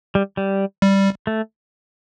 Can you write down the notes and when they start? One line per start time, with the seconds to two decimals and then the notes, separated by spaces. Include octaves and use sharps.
0.15 G3
0.37 G3
0.82 G3
1.27 A3